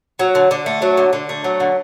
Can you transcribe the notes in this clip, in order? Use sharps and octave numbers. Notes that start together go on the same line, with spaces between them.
F#3
D3
D3
A3
F#3
D3
D3
A3
F#3
D3